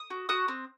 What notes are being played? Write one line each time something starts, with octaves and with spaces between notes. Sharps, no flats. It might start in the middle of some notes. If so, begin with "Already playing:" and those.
Already playing: D#6
F#4
F#4 D#6 F#6
C4